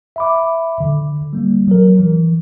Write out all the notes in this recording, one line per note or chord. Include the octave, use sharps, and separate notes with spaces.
E5 B5 D6
D3
G3 A#3
F#3 A#4
E3